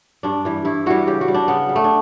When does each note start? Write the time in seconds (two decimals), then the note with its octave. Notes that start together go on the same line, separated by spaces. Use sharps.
0.23 G2 D4
0.45 E3 G3
0.65 G2 E4
0.86 E3 G3 F#4
1.07 C#3 G4
1.21 F#4
1.28 G3
1.34 D4
1.48 C#3 B3
1.69 G3
1.76 A3
1.84 D4